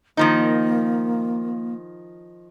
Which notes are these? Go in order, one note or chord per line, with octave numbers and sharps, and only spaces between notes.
D#3 F3 A#3 D#4